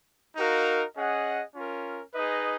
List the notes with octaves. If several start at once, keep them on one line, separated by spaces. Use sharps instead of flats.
D#4 F#4 A#4 F5
C#4 G#4 D#5 F#5
C#4 F4 A#4
D#4 G#4 B4 D#5